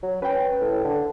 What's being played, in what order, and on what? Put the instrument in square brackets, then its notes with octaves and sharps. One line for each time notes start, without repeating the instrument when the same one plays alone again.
[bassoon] F#3
[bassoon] C#4 [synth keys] B4 G5
[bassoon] A2
D3